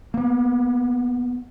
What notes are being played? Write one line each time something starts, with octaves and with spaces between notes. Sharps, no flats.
A#3 B3